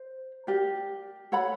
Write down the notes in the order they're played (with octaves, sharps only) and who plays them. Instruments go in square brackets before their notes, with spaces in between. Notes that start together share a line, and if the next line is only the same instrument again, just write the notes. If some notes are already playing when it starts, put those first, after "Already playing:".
Already playing: [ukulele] C5
G4 A#4 D5
A4 C#5 F#5 B5